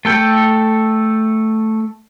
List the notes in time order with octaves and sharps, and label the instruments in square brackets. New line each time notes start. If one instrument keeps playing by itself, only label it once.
[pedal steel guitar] A3 A4 G5